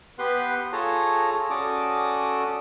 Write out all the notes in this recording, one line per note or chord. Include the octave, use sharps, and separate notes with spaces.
B3 G4 B4 F#5 C6
F4 G#4 A4 C#5 A5 A#5
C#4 F#4 A4 D5 D6 D#6